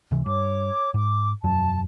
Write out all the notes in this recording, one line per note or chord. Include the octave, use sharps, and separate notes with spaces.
C#2 C3 E3
G2 C#5 D6
G#2 D6
E1 F#2 F#3 A5